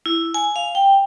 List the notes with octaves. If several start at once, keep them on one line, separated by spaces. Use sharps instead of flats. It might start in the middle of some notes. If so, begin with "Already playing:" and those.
E4
G#5
F5
G5